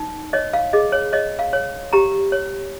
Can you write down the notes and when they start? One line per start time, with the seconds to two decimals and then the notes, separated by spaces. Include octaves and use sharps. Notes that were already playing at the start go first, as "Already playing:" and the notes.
Already playing: D#4
0.33 C#5 D#5
0.53 F5
0.73 G#4 D#5
0.92 C#5
1.13 C#5 D#5
1.39 F5
1.53 C#5
1.93 G4 A#5
2.32 C#5